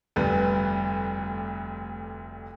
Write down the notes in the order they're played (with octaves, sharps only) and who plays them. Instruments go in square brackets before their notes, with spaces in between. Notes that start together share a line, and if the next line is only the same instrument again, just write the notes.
[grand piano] F1 D2 G2 B4